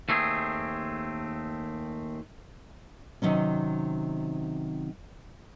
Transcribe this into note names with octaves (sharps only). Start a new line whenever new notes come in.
D#2 A3 C4 G#4
C3 D#3 F#3 C#4